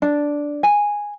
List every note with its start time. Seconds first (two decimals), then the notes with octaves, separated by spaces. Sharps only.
0.02 D4
0.63 G#5